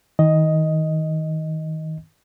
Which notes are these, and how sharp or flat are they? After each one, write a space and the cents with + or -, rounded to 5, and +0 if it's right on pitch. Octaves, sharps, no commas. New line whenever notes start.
D#3 +30 D#5 +5